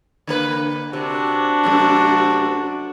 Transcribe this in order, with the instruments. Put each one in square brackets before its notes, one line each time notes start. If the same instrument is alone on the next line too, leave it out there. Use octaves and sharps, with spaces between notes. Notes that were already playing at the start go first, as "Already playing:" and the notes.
[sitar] D3 A#3 B4
[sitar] C3 [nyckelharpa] D4 F#4
[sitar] F#2 C3 A3